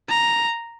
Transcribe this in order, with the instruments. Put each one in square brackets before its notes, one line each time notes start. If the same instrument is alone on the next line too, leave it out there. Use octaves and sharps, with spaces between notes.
[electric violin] A#5